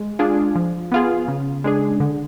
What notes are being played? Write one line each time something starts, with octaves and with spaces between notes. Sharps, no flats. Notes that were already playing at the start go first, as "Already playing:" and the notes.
Already playing: G#3
D4 F4 G#4
F3
B3 F4 G#4
C#3
G#3 D4 G#4
D3